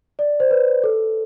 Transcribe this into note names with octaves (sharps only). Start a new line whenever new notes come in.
D5
C5
B4
A4